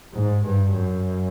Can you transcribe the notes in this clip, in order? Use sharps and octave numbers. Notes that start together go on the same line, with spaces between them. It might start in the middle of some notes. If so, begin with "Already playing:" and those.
G#2
G2
F#2